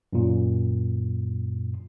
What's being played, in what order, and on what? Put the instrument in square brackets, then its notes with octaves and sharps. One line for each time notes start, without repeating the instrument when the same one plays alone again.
[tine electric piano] F#2 A#2